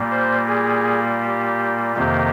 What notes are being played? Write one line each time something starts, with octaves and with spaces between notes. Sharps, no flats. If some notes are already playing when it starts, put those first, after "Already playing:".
Already playing: A#2 G3 A#3
C5
G#4
G4
F2 C3 D#3 A#3 G4